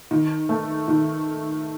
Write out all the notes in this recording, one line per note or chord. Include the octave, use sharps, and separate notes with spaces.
D#3
A3
D#3